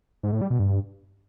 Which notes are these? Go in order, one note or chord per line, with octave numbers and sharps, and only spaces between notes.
G#2
A2
G3
B2
G2